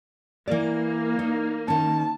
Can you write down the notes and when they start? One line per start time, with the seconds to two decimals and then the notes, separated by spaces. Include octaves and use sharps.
0.48 E3 A#3 D5
1.19 D#4
1.68 D#3 C#4 A5